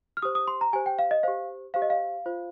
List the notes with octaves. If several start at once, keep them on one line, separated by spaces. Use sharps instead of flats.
F6
G4 C5 D#6
D#6
C6
A#5
G4 C5 G#5
G5
F5
D#5
G4 C5 F5
G4 C5 F5
D#5
F5
F4 C5